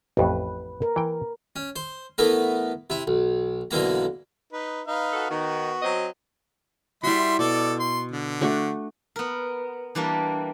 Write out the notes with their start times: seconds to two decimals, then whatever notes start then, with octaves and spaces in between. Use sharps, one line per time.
0.17 A1 F2 A2 B4
0.82 A#4
0.96 E3 G5
1.56 C#4
1.76 C5
2.18 E3 A3 B3 A#4
2.90 C3 E4
3.07 B1
3.71 B1 D3 E3 A#3 A#5
4.52 D#4 B4
4.87 D#4 B4 F5
5.13 F#4 A4
5.30 D#3 B3 F#4
5.82 F#3 C4 D#5
7.03 G3 E4 F#4 E5 C6
7.39 B2 A4 D5
7.80 C6
8.11 D3
8.41 A3 D4 F#4
9.16 B3 A#4
9.95 E3 G3 A#3 D4